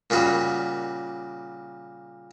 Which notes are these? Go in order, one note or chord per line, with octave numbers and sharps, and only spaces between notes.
A#2 C#3 G3 F#4